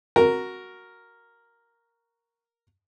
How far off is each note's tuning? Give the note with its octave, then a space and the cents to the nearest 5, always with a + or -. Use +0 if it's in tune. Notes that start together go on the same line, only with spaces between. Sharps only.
F#4 +0 A#4 +0